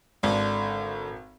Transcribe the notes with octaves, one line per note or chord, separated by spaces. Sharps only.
G#1 D3